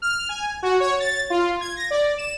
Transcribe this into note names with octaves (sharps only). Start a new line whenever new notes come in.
F6
G#5
F#4
C#5
A6
F4
G#6
A#6
D5
E7